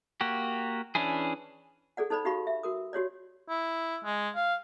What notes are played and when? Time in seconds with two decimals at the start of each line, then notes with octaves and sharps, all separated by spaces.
0.21 A#3 F#4 G4
0.95 E3 C#4 D4 E4 G#4
1.97 G#4 A4 D5 F#5
2.10 D#4 A4 C5 D5 B5
2.25 D#4 F#4 G4 F5 B5 C#6
2.47 E5
2.63 F#4 A#4 D#6
2.93 F#4 G4 C#5 D5
3.48 E4
4.04 G#3
4.35 F5